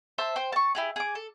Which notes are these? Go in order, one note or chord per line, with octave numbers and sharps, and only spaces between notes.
C5 E5 A5
C5 G5
A5 C#6
E4 G4 G#4
G#4 D6
A4